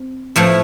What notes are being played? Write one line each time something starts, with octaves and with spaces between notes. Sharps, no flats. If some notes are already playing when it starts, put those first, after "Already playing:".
Already playing: C4
A2 F3 A3 E4